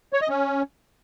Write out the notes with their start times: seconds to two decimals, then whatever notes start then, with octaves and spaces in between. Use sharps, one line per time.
0.13 C#5
0.21 D#5
0.29 C#4